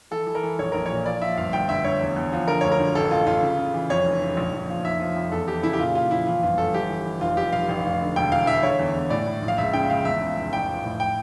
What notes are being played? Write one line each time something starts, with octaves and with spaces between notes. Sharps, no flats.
E3 A4
E3
A#4
E3
A#1 C#5
A#1 A#4
A#2 C#5
F3 D5
F3 E5
G1 F5
D2 G5
D2 E5
D2 C#5
E2
E2
F3
D3 A#4
D2 C#5
A#4
D2
A1 A4
A1 F4
A1 F4
C#3
C#3
E3
F2 C#5
F1
C#3
A#1
A#1
F3
F1 E5
F3
F2
E2 A4
E3 G4
C#3 E4
G4
A#2 F4
A#2 F4
F3 E4
E3 F4
G1 F4
G1 A4
E3 G4
E3
E3
F1 F4
F1 G4
F1 F5
A1
A1
D3
E1 G5
E3 F5
E3 E5
D3 C#5
E2
E2
A2 D5
A2
A#1
F5
C#2 E5
C#3 G5
C#2 F5
E2 E5
C#3
F1
A1 G5
F3
A2
G5